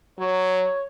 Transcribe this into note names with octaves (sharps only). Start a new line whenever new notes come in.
F#3 C#5